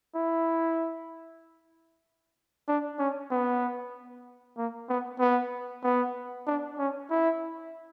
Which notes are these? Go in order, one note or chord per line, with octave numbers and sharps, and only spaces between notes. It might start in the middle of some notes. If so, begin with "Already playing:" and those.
E4
D4
C#4
B3
A#3
B3
B3
B3
D4
C#4
E4